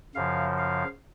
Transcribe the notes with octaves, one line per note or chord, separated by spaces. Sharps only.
F#2 C#3 F3 F5
F5